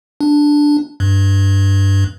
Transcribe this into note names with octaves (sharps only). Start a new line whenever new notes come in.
D4
G2